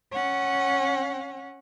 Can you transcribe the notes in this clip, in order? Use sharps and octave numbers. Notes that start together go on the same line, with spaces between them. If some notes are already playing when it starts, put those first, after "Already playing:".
C#4 F#5